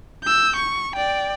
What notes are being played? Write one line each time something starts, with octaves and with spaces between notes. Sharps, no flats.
E6 G6
C#6
D5 G5